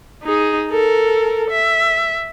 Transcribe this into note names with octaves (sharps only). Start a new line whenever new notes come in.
D#4 G#4
A4 A#4
E5